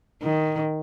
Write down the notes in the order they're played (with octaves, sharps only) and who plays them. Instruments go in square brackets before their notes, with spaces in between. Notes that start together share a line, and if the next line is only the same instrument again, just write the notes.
[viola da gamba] D#3